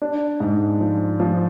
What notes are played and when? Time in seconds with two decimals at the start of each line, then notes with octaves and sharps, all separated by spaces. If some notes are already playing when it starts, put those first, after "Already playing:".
0.02 D4
0.40 G#2
0.81 F3
1.20 F3